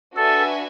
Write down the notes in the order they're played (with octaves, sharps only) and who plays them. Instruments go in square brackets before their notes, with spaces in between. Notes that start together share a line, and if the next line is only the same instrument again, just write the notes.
[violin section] D4 F#4 B4 E5 G#5 [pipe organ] A4